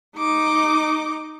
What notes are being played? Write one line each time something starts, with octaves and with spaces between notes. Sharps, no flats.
D#4 D6